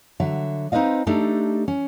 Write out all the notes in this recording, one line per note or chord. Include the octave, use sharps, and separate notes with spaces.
D3 F#3 E5
C4 D#4 B4 C5 D#5 F5
A3 D4 D#4 G4 A4
C#4